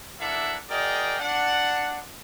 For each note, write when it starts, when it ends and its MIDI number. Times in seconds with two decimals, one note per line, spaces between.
0.19 0.56 58
0.19 0.56 62
0.19 0.56 64
0.19 0.56 69
0.19 0.56 76
0.19 0.56 78
0.69 1.16 66
0.69 1.16 68
0.69 1.16 70
0.69 1.16 74
0.69 1.16 75
0.69 1.16 79
1.19 1.98 62
1.19 1.98 78